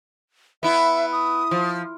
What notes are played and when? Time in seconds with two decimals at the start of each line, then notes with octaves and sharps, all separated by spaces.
0.63 B3 E4 E5
1.12 D#6
1.51 F3